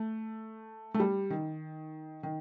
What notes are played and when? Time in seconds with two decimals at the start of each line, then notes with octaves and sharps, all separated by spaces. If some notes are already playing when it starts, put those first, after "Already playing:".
Already playing: A3
0.94 A3
1.00 G3
1.30 D#3
2.23 D#3